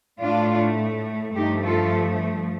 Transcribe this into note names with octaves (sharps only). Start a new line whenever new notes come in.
A2 A3 D4 F4
G2 F3 A3 D#4 G4
F4 A4